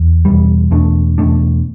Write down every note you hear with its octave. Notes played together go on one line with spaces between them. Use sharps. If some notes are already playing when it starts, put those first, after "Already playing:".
Already playing: E2
E2 B2 G3
E2 B2 A3 D4
E2 B2 A3 D4